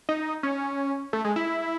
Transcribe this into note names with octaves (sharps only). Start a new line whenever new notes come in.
D#4
C#4
A3
G#3
E4